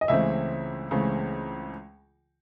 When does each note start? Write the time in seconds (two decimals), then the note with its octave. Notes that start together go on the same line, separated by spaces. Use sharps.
0.01 D#5
0.08 C#2 C#3 E3 A3 C4 E5
0.91 C#2 C#3 E3 A3 C4